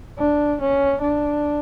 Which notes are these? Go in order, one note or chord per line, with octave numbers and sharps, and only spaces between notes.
D4
C#4
D4